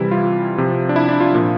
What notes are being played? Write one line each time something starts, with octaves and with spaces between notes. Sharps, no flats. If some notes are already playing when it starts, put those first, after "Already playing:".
Already playing: C3 E3 G3 E4
F4
C3 F3
D4
E4
D4
F4
A#2 F3